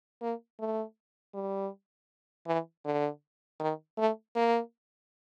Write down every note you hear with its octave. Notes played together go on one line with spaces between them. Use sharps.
A#3
A3
G3
E3
D3
D#3
A3
A#3